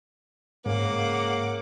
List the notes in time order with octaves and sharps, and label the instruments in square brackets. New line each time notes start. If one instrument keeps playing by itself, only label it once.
[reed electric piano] G#2 [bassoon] C#3 [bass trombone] A#3 [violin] F#5 D6